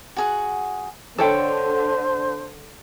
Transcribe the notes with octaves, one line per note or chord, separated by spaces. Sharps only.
F#4 G#4 F#5
D3 A4 C5 C#5 G5 B5